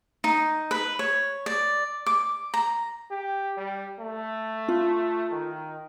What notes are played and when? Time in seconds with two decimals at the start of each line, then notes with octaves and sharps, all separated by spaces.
0.24 D#4
0.71 B4
0.99 C#5
1.46 D5
2.06 D6
2.54 A#5
3.11 G4
3.57 G3
4.00 A3
4.68 F4
5.32 D#3